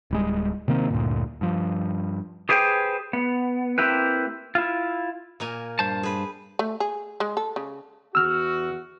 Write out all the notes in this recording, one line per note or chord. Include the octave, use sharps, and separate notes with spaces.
D1 G3 G#3
C3 D#3 A#3 C4
D2 G2 A#2
G2 F3
G4 G#4 B4 C5 G5
B3
A#3 C4 E4 G4 B4
E4 F4
A#2 A#3 G#5
G2 C5 A5
G#4 B4
A3
G#4
G#3
A4
C#3
E2 F#4 E6 F6